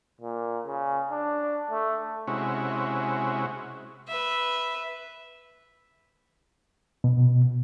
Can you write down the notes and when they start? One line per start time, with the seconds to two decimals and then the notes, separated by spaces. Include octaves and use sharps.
0.21 A#2
0.66 C#3
1.11 D4
1.71 A3
2.28 C3 G#3 C#4 E4 F#4
4.08 B4 E5
7.04 B2